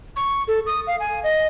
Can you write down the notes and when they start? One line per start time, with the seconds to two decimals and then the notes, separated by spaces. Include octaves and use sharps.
0.16 C#6
0.48 A4
0.66 D#6
0.87 F5
1.00 G#5
1.24 D#5